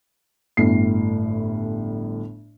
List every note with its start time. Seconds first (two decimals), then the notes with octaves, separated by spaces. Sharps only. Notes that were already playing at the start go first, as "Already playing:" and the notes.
0.57 G1 A2 C7